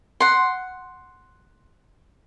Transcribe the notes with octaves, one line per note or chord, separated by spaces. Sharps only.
F#5 C6